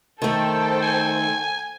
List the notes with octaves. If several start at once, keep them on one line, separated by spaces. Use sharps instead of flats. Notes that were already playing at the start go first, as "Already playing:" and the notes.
D#3 A3 A4 C5 G5
G#5